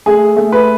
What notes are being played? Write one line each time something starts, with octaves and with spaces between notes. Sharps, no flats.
A3 G#4
A3
B4